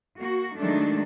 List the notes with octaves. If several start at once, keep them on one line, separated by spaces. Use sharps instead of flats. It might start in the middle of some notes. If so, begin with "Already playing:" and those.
A#3 F#4
D#3 F#3 G#3 A3 D4